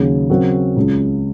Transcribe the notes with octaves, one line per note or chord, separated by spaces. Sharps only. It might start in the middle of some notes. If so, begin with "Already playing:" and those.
Already playing: D#2 C#3 F#3 C#4 G#4
C#3 F#3 C4 F#4 A#4
C#2 C#3 G#3